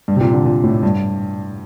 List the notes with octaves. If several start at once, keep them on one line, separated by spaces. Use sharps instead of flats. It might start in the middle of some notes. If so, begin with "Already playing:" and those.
G2
C3
A#2
D3
A#2
A2
G2